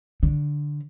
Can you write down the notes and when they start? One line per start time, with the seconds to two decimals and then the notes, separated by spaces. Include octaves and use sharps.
0.23 D3